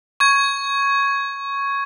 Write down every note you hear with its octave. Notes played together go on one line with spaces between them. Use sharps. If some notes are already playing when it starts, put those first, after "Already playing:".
C#6 G#6